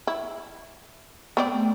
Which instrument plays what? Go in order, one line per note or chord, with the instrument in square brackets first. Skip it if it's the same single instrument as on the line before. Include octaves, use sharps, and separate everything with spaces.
[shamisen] E4
[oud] A3 A#4 [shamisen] B3 C4 D5